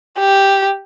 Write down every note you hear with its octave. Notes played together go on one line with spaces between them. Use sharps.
G4